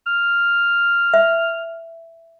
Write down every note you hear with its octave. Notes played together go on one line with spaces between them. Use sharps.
F6
E5